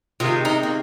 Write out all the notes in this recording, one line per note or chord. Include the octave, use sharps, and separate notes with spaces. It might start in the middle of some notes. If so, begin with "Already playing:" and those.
C3 D#3 G#3 F4
D#4
A#3